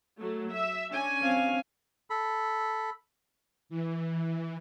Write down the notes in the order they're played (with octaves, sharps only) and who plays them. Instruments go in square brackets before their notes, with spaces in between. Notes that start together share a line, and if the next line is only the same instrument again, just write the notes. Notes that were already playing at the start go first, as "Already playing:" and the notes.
[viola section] F#3 A3
E5
C#4 D4 G#5
[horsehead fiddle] C4 F5
[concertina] A4 B5
[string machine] E3